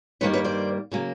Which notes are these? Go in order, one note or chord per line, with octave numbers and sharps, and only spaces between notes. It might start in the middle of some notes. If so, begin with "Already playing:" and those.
G2 D#3 G3 A#3 B4 C#5
B4 C#5
C5 D5
C#3 F#3 A#3